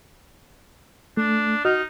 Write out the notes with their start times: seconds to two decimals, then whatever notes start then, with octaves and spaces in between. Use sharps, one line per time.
1.17 A3 D4
1.65 D#4 F#4 D#5 F6